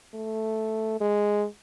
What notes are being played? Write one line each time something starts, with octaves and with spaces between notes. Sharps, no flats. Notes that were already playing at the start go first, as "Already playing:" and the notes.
A3
G#3